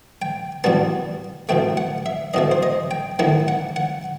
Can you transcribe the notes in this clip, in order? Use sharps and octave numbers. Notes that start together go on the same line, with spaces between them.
G5
E2 B2 G3 B3 A5
C2 B2 A3 G5
F#5
E5
C2 B2 A3 D#5
C5
D#5
G5
D#2 D#3 A3 E4 F#5
F#5
F#5